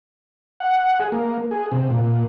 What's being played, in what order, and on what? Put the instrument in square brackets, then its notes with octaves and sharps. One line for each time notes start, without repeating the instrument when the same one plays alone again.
[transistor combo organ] F#5
G#4
A#3
G#4
C3
A#2